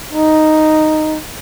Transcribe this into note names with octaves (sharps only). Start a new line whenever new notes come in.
D#4